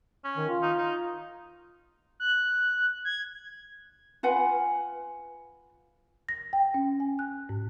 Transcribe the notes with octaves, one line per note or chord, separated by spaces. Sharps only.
C#4
D#3
F4
D#4
D#4
F#6
G#6
F4 B4 F#5 G#5
A#6
G5
C#4
G#5
F#6
G#2